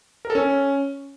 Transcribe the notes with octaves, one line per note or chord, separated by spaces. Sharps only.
A#4
A4
C#4